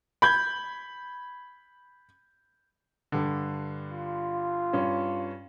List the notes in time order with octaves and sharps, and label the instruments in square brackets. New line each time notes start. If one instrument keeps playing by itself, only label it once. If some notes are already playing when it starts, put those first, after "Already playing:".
[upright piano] B5 G6 G#6
G2 D3
[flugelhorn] F4
[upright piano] G2 C#4